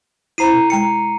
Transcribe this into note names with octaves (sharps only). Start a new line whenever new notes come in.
E4 C5 A#5 B5 C7 D#7
B2
G#3 G5 A#5 C#7